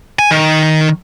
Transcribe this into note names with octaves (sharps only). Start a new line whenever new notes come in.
G#5
D#3